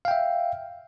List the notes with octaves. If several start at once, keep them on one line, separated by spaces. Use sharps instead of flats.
E5 F5 G5